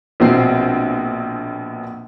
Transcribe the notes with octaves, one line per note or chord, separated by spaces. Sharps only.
A#1 B2 C4 C7